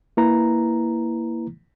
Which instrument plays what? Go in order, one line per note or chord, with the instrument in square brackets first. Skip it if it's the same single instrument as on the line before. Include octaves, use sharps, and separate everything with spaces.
[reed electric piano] A#3 E4 B4 A#5